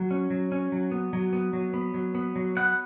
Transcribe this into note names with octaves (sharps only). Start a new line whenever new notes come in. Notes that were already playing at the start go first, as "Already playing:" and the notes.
Already playing: F#3
C#4
F#3
C#4
F#3
B3
F#3
B3
F#3
B3
F#3
B3
F#3
B3 F#5